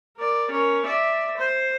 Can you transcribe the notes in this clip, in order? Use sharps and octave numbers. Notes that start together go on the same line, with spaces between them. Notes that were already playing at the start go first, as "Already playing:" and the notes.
A#4 D5
C#4 A#4
D5 E5
C5